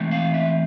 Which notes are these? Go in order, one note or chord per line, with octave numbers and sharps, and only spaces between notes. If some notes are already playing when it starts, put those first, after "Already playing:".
Already playing: E3 A3 C4
F5
E5